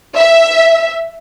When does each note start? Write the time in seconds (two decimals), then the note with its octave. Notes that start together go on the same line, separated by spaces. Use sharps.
0.17 E5